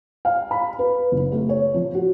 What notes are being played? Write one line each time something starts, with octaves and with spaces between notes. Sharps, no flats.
F5
B5
B4
F#1
A3
C#5
F3
F#4